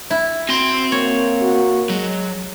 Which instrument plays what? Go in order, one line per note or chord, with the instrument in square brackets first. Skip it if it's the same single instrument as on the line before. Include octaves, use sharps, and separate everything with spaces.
[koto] E4
[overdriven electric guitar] C4 C6 [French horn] F#4
[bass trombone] A#3 [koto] C#5
[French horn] F#4
[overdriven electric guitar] F#3 [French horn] G#3